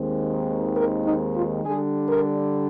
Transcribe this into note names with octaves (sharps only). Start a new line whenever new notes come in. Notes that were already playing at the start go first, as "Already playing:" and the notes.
Already playing: D#2 D#3 G#3 C4
A#4
D#4
F4
D3 G3 D4 G#4
A#4